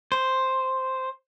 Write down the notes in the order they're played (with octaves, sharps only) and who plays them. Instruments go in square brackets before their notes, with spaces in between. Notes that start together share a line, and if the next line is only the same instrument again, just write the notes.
[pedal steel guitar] C5